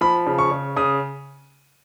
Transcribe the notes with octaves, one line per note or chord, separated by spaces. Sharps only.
F3 B5
C#3
C#6
C#3
C#3 D#6